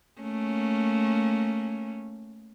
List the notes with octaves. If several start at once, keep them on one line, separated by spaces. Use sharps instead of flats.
A3 A#3 C#4